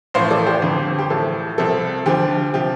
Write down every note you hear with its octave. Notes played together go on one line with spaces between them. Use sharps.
A1 A2 F3 C5 F5
A4 D5
G4 C5
G1 F2 D3 F3
G4
A1 A2 F3 A4
C2 C3 F3 A4
D2 D3 F3 G4
C3 F3 G4